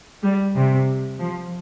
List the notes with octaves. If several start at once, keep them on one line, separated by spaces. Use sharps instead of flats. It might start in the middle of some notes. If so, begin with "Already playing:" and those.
G3
C3
F3